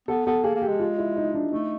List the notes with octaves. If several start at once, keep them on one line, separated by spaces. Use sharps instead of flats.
B3 A4
B3 A4
A#3 G#4
A#3
G4
G#3
F4
E4
D#4
D4
A3 D#4